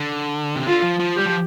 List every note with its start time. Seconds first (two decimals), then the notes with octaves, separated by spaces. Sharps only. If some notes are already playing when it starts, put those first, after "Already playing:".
Already playing: D3
0.56 C3
0.67 D3 F4
0.84 F3
0.99 F3
1.16 G3 G4
1.26 F3